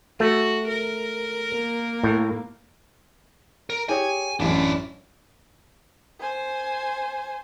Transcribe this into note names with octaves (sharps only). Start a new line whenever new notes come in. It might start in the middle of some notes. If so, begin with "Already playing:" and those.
A3 F#4
A#4
A#3
A2
A#4
G4 G#4 C#5 G#5
A1 F#2 D4 E4
C5 G#5